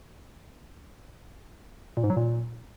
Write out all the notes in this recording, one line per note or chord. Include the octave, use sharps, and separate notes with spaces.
A#2
G#2
F#3
A#2